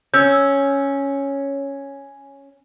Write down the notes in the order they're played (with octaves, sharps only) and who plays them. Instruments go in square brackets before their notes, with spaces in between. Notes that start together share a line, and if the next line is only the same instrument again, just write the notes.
[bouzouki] C#4 [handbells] E6 G6